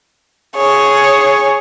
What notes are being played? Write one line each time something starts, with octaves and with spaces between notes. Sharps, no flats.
G#4 C#5